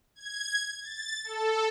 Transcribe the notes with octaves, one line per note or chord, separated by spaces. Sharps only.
G#6
A6
A4